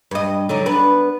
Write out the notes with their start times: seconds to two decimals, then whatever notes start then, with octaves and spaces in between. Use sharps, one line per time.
0.11 G2 D#5
0.49 D3 F#3 D#4
0.66 B3 D4 B4